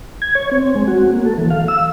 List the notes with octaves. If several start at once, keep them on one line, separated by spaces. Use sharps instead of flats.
G#6
C#5
C4
G#3
F#4
A#3
A4
E3
F5
E6